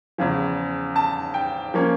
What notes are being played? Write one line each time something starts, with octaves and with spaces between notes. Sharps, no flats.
E2 C#3 F3
A5
G5
F3 A#3 C#4